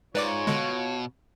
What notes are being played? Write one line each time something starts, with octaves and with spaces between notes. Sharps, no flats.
G#2 F4 B4 C#5 D5 D6
B2 D3 G#3